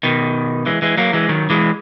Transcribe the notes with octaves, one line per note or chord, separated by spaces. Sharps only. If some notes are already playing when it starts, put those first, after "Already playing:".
B2 D#3
E3 G#3
E3 G#3
F#3 A#3
E3 G#3
D#3 F#3
E3 G#3